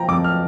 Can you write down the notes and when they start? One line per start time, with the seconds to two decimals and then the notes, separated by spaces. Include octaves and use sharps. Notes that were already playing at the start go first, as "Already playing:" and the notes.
Already playing: F3 G5 A#5
0.08 F2 D6
0.24 F6